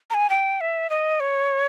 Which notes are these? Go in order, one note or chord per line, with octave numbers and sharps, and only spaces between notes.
A#5
G#5
G5
E5
D#5
C#5